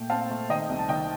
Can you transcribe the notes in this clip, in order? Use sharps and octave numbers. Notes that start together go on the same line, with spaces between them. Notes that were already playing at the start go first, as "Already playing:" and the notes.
Already playing: A#2 A3 G5
C4 F5 A5
A3
D#3 D#5 G5
C2
A5
D#3 D#5 G5